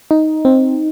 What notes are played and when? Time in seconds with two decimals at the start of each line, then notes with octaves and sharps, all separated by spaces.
0.11 D#4
0.45 C4